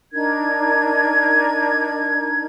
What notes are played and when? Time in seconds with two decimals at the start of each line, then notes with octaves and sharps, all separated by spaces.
0.13 D4 D#4 A#4 G#6